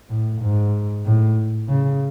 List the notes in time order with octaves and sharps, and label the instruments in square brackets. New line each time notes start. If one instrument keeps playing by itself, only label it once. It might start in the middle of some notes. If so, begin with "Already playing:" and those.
[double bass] A2
G#2
A2
C#3